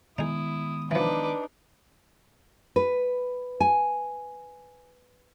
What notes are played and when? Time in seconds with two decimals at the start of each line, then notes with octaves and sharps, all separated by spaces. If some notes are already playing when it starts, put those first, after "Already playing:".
0.18 D#3 G#3 B3 D#4 E4 G#4 D#6
0.91 E3 F3 D4 D#4 B4 D6
2.76 B4
3.60 G#5